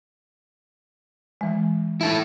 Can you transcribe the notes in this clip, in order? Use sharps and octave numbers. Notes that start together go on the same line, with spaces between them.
E3 G#3
E4 A4